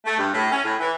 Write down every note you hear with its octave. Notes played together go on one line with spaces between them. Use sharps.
A3
G2
A2
C#4
A2
E3